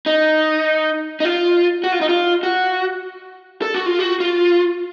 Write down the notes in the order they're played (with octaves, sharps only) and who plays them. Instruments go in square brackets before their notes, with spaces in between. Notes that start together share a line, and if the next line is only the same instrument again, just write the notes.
[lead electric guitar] D#4
D#4
F4
F#4
F4
D#4
F4
F#4
A4
F#4
F4
F#4
F4